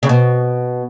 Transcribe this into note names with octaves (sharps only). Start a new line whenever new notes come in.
C#3
B2